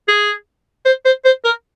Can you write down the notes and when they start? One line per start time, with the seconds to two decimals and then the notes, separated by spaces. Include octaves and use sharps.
0.08 G#4
0.85 C5
1.05 C5
1.25 C5
1.45 A#4